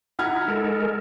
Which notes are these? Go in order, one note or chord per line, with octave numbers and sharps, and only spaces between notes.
D#4 E4 F#5 F6 G#6
G#3 A4 A#4